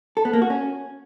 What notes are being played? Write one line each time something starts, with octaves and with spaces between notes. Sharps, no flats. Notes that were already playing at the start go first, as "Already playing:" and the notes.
A4
B3
A#3
F#4
C#4